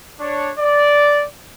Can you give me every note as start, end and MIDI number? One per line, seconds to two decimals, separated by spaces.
0.19 0.50 62
0.19 0.50 73
0.59 1.25 74